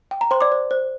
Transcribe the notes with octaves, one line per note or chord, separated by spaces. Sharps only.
G5
A#5
C5 G5 C6
D5 D6
C5
C5